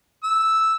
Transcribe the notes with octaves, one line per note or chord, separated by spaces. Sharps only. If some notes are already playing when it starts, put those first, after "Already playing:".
E6